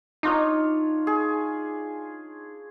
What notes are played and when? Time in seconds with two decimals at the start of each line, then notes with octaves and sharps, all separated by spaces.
0.23 D4 D#4 F4 C#5
1.07 G#4